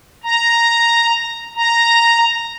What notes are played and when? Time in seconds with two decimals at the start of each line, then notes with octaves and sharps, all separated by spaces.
0.24 A#5
1.56 A#5